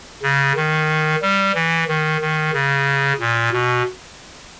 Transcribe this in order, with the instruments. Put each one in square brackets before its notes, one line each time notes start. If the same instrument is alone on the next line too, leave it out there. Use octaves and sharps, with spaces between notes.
[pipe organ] C#3
D#3
G3
E3
D#3
D#3
C#3
A#2
B2